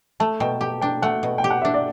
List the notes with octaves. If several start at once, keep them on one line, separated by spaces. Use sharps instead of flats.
A3 A5
B2 G5
G4 G5
D4 G5
A3 F#5
B2
G5
G4
F#5
D4 E5
D5